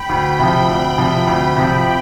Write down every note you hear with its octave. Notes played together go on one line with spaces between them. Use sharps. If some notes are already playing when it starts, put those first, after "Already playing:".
Already playing: G5 B5
D2
C3 F3 G5 B5
D2
C3 F3
D2
C3 F3